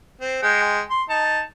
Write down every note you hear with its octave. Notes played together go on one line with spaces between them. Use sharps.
C4
G#3 G5
C6
D#4 A5